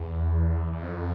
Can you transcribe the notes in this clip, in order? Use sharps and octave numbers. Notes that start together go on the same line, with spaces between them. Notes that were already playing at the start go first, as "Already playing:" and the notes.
Already playing: E2
E2
F2